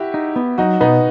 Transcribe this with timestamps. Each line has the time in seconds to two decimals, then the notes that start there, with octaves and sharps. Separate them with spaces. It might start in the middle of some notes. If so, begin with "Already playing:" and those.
Already playing: E4 F#4 G4
0.14 D#4
0.36 B3
0.58 F#3 D#4 F#4
0.80 B2 B3 D#4